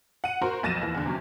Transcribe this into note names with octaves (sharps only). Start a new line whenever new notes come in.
F#5 D#7
F#4 A#4 C5 A#5 C6
B1 F2 A6 A#6 D#7 E7
D#2 E3
E2 D3
C3 F#3 C#4